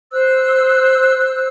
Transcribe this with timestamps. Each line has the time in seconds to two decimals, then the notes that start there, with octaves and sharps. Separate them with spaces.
0.11 C5 E6 F#6